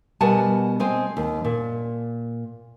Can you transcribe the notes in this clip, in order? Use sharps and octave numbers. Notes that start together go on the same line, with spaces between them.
B2 G3 A#4 F#5 G#5 A5
G#3 C4 G#5
D#2
A#2